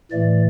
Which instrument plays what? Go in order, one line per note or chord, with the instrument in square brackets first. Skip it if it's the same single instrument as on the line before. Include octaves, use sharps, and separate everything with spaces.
[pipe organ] A2 E3 A3 D5